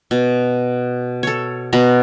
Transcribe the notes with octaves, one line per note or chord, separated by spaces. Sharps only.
B2
A4 C#5
B2 B4 A#5